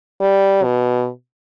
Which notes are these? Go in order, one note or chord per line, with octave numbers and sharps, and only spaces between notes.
G3
B2